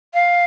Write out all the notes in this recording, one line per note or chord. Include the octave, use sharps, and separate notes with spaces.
F5